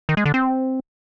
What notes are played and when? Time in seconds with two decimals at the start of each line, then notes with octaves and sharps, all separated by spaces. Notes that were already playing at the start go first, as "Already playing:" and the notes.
0.09 D#3
0.17 G#3
0.26 D3
0.34 C4